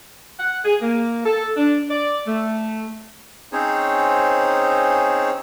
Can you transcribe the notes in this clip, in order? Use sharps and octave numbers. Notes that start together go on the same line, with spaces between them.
F#5
G#4
A#3
A4
D4
D5
A3
C4 C#4 D#4 G#4 C5 C#5